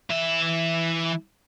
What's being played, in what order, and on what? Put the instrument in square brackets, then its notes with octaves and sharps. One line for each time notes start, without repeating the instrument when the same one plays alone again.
[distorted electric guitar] E3 E5